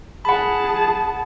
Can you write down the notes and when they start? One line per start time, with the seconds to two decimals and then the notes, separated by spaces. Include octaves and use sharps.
0.25 G#4 F#5 A5 B5